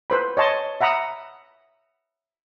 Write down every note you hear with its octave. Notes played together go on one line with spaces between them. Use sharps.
B4 C5 B5
C#5 D#5 A5 C6
E5 F#5 A#5 B5 D#6